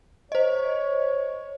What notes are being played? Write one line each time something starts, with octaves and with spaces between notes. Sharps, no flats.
C5 C#5 D#5